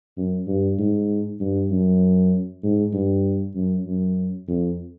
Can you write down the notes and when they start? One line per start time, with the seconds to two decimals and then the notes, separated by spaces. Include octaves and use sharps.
0.17 F#2
0.48 G2
0.79 G#2
1.40 G2
1.71 F#2
2.63 G#2
2.93 G2
3.55 F#2
3.86 F#2
4.48 F2